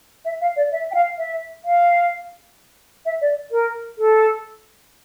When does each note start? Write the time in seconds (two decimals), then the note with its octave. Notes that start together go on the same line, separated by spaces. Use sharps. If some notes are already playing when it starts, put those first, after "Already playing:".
0.25 E5
0.41 F5
0.56 D5
0.72 E5
0.91 G5
0.95 F5
1.18 E5
1.65 F5
3.06 E5
3.21 D5
3.52 A#4
3.98 A4